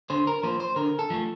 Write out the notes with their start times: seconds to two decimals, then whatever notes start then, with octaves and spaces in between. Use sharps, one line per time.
0.10 D3 C5
0.27 A#4
0.43 F3 A#3 C5
0.60 C5
0.76 D3 A#4
0.99 A4
1.10 F3 A3